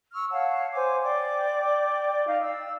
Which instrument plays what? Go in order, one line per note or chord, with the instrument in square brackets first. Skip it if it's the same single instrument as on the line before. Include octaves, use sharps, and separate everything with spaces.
[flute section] C#6 E6 F6
C#5 F5 F#5 A5
C5 C#5 G#5 D6
D5 G5 D6
D#4 F5
E6